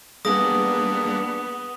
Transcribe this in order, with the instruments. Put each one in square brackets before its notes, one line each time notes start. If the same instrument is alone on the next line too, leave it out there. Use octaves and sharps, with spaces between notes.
[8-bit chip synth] G3 A#3 D4 [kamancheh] B3 [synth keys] G#4 [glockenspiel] D#6 A#6